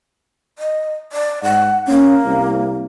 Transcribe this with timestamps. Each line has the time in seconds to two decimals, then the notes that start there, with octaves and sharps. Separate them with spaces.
0.59 D#5
1.12 D5
1.43 G#2 F#5
1.88 A#3 C#4
2.25 C2